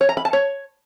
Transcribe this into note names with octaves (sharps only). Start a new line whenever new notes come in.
C#5
A#5
B5
A5
C#5